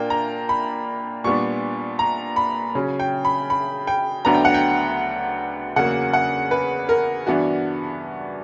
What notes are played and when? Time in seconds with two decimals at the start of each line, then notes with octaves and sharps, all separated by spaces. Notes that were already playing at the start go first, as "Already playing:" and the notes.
Already playing: A#2 A#3 D4 G5
0.10 A#5
0.49 B5
1.24 A#2 G3 B3 D4 C#6
1.99 A#5
2.36 B5
2.75 C#3 F#3 C#4
3.00 G5
3.25 B5
3.50 B5
3.87 G5
4.25 D2 D3 F#3 B3 D4 A#5
4.34 G5
4.45 F#5
4.54 G5
5.76 E2 C#3 F#3 A#3 F#5
6.13 F#5
6.51 B4
6.89 A#4
7.27 G2 E3 B3 D4 F#4